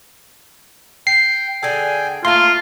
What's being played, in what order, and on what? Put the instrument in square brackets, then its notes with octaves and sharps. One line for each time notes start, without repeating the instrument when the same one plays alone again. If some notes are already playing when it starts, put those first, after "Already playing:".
[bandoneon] G5 [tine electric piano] C7
[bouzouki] D3 G#4 A4 [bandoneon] G5 G#5
[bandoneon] A3 [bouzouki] A#3 A4 [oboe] F4 [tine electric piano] C6